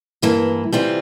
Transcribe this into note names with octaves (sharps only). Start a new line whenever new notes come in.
G2 E3 A#3 E4
C3 E3 G3 C4 F4